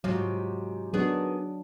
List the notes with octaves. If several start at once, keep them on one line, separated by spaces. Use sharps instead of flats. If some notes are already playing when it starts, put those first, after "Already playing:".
G#2 C3 F#3 F4 F#4
D#3 F#3 B3 D4 G#4